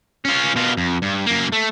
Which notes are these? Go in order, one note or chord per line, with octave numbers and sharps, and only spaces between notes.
C#4 F4
B2 F4
F2
G2
F#2 A#3
A3